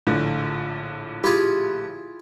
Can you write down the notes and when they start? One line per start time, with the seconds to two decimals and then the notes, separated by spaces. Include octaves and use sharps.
0.07 A#1 A2 D3
1.24 E4 F4 G4 G#4